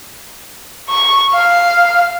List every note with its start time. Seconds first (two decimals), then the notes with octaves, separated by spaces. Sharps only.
0.90 C#6
1.34 F5